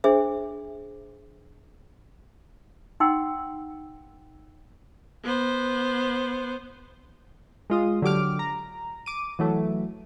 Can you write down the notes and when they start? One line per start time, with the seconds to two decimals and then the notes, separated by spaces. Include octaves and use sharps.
0.04 D4 G#4 C5 E5
3.00 D#4 F#5 G5 C6 E6
5.24 B3 C5
7.70 G#3 F4 D#6
8.02 D3 F#3 G4 D6 F6
8.39 A#5
9.06 D6 D#7
9.39 E3 F#3 A3